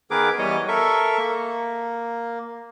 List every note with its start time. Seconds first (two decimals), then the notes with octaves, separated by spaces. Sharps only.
0.11 D#3 B3 G#4 A#4 B4 D6
0.39 E3 G3 B3 C#5 D#5
0.68 A4 A#4 E5 C#6
1.18 A#3